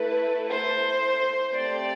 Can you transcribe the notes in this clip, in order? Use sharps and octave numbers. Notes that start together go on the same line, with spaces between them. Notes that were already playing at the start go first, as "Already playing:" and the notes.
Already playing: A3 E4 A4 B4
C5
A3 C4 G4 D5